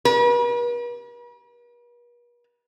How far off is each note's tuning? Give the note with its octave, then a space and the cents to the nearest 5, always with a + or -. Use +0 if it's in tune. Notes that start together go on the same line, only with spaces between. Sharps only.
B4 -45